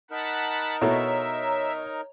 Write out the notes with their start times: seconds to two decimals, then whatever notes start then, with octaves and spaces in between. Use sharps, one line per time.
0.11 D#4 A#4 F#5 A5 B5
0.81 B2 E4 A4 C#5 D#5 E5 A#5